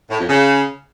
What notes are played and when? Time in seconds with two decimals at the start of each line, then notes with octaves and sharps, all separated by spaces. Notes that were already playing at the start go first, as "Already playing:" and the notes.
0.09 A2
0.18 F2
0.27 C#3